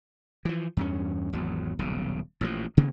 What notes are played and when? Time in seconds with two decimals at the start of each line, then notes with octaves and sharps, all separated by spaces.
0.45 E3 F3
0.77 E2 G2 C#4
1.33 G#1 E2 F#3
1.79 D#1 B1 C#3
2.41 A1 A#2 C#3 F3
2.77 C3 D#3 A#3 B3